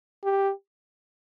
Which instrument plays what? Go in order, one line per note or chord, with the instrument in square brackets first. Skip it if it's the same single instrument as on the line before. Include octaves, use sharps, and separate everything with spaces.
[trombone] G4